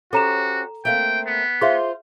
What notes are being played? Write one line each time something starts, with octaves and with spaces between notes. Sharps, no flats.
C#4 F#4 G4 A4 C5 A#5 E7
A3 A#3 C4 G5
B3
F4 G#4 C5 E5